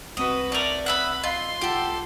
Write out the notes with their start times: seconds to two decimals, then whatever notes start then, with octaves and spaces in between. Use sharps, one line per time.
0.17 C2 C4 F#4 B4 D#5 D#6
0.52 A3 A#4 D5
0.86 B4 E5 F#5 B5
1.24 F4 D#5 F5 C6 E6
1.61 C2 F4 G4 A4 F#5